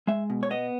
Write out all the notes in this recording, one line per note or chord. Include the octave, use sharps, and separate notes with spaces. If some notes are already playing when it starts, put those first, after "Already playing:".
G#3 E5
B2
C#5
B3 D#5